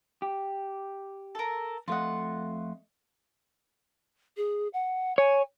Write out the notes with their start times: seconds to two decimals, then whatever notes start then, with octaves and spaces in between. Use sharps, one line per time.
0.22 G4
1.35 A4 A#4
1.88 F2 A3 F4 D#5 F#5
4.37 G#4
4.74 F#5
5.18 C#5 G#5